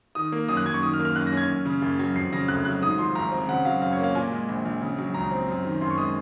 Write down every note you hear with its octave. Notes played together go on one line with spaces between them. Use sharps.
D#3 D#6
A#3
F#2 D#6
F#6
F#2 G#6
C#6
D#3 D#6
F6
A#3
F6
F#2 F#6
A#6
C#4 G#6
F#2
C#3
F#1
F#3
F2 C7
C#3 A#6
F1 F#6
F#3 F#6
G#2 D#6
F3 C6
G#1 A#5
C4
C#3 F#5
F#3 F5
F#2 F5
C#5
A#3
F5
A#2 G#5
G#3
A#1
A#1
C#3
F#3
C#2 A#5
C4
F#2
D#3
F#1 C6
C#6
G#3 D#6